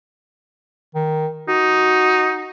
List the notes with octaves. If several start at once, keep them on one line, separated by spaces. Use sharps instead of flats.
D#3
D#4 F#4